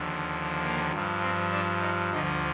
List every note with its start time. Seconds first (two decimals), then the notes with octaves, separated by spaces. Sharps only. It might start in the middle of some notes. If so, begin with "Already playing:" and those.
Already playing: D#2 D3 F3
0.62 A#3
0.92 G2 F3
1.22 C4
1.51 D4
1.81 D#4
2.11 D2 D3 F3 D#4